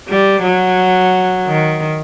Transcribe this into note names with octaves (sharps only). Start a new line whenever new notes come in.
G3
F#3
D#3